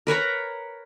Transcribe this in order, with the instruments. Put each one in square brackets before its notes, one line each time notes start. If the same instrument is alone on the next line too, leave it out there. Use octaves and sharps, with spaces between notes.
[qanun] A#4 B4 C#5 A#5